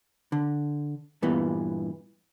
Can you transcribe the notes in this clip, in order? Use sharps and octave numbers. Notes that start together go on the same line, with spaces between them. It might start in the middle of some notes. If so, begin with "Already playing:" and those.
D3
G2 A#2 E3 B3